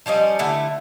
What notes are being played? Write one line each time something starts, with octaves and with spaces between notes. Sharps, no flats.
F3 G3 C#4 D#5
D3 A3 E4